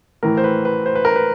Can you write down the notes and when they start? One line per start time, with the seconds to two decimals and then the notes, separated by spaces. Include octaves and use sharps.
0.23 A2 E3 A#4
0.37 C5
0.44 B4
0.65 B4
0.86 C5
0.95 B4
1.05 A#4
1.16 B4